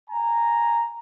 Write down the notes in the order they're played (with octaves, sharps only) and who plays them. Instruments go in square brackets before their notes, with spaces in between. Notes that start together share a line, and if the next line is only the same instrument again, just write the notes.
[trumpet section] G#5 A#5